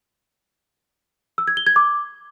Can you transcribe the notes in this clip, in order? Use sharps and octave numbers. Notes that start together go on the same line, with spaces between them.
E6
G#6
G7
G#6
D6